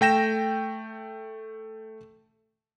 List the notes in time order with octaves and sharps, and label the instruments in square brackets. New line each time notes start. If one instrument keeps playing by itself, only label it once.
[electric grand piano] A3 G5 A#6 E7